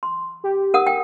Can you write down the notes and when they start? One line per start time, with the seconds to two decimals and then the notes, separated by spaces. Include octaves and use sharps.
0.03 C6
0.44 G4
0.74 A#4 F#5 D#6
0.87 G5